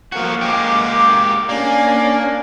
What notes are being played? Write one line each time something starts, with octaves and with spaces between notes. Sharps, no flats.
F3 A#3 F#4
G#3 G4 D6
A#3 C#4 D4 D5 G#5